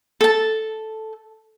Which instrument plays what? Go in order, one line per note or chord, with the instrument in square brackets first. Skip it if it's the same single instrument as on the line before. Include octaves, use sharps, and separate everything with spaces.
[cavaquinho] A4 A5